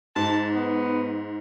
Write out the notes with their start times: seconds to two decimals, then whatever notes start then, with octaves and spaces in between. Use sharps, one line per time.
0.16 G#2 A5
0.53 B3